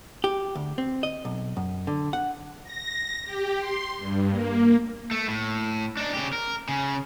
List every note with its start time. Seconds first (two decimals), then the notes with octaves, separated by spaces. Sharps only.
0.24 G4
0.55 D2
0.78 C4
1.03 D#5
1.25 B1
1.57 F#2
1.87 D3
2.13 F#5
2.64 A#6
3.25 G4
3.58 C6
3.97 G2
4.31 A#3
5.11 A3
5.28 A2
5.97 D4 D#4
6.14 C#3 G4
6.33 A#4
6.69 C#3